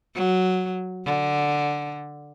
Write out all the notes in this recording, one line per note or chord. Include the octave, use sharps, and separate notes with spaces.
F#3
D3